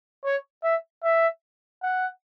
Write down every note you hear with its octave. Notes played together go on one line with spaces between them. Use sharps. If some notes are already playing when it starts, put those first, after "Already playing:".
C#5
E5
E5
F#5